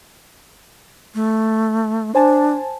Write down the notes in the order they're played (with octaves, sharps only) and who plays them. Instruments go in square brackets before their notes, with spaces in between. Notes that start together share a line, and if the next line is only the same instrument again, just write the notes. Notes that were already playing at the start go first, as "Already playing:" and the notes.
[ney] A3
[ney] D4 [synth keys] C5 G#5 A5